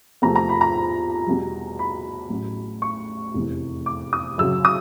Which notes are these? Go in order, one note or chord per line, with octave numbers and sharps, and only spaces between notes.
E2 C3 F3 A3 A#5
A#5
B5
A#5
E2 B2 G3
B5
A1 A2 F#3
C#6
F1 E2 C3 E3
D6
D#6
F#2 C#3 F#3 E6
D#6